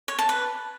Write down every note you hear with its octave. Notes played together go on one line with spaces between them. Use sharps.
C#5
A5
B4